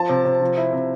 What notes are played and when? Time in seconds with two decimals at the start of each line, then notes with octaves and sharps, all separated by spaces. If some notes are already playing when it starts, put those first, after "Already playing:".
Already playing: F3 A5
0.09 C3
0.25 C3
0.41 F3
0.57 E4
0.73 C3